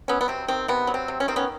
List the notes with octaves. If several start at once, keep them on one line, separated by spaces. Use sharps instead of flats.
F#3 B3 C#4
B3
C3 C4
D#3 C4
C3 B3
F#3
C4
C3
C#4
D#3 C4
B3 C#4